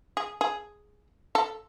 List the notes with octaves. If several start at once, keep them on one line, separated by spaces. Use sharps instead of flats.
G#4
G#4
A4